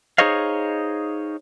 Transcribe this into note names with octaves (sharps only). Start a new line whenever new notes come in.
D#4 G#4 C5 C#5 D#5 F5